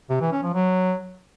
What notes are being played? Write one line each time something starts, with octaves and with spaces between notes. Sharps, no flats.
C3
E3
C#4
F3
F#3